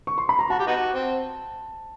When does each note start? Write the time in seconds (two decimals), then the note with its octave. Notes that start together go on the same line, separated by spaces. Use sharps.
0.07 C#6
0.18 C6
0.29 B5
0.39 A#5
0.50 F#4 A5
0.59 G4
0.67 B3 D#4 F#4
0.94 C4